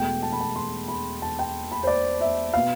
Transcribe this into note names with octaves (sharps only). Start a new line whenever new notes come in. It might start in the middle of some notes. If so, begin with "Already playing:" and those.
Already playing: E1 E2 B2 A3 G5
A5
B5
A5
C6
B5
A5
G5
B5
C5
D5
E5
B2 B3 F5